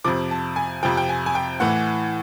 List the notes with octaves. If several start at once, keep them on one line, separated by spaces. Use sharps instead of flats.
F2 C3 F3 D6
A5
G#5
F2 C3 F3 G5
G5
G#5
G#5
G5
A2 E3 F#5